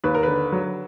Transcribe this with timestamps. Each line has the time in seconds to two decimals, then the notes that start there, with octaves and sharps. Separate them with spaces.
0.04 D#2 B4
0.14 A#4
0.23 D3 B4
0.52 F#3